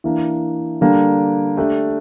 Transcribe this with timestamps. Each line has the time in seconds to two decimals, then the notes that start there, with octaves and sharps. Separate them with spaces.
0.04 E3 A#3 D4
0.81 D3 G3 A#3 D4 G4
1.57 A3 D4 G4